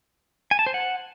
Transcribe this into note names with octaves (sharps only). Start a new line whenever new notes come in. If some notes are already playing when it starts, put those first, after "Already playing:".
G#5
A5
C5
F#5